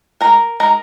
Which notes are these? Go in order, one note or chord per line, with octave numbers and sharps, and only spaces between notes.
G#3 D#4 A#4 A#5
G#3 D#4 A#4 A#5